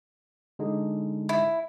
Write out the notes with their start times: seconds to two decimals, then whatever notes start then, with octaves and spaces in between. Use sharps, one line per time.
0.59 D3 G#3 D#4
1.29 E4